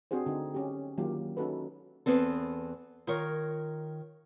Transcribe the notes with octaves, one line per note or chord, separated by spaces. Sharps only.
C4 D4 F#4 G#4 C5
D3 D#4
C#4 G4
D#3 F#3 A#3 F4 G4
C#4 D#4 F#4 A4 B4
E2 B3 C4 A4
D#3 F4 A#4 C#5